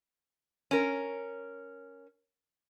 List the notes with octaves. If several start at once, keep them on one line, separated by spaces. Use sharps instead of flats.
C#4 A#4